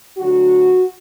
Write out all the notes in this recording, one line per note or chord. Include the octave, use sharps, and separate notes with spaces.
D2 D3 F#3 F#4